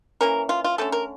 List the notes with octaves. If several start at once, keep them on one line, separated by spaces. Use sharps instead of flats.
E3 A#3 C#4 A#4
F4
F4
D3 A3 C#4 A4
A#4